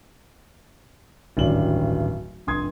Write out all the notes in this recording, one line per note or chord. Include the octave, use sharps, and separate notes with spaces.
D1 G#1 G2 G3 C#4 F#7
F1 G2 C6 D#6 G#6